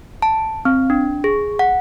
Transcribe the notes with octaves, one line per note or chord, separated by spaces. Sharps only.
A5
C4
D4
G#4
F#5